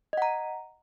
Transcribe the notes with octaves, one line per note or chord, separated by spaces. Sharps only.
D#5 F#5 A#5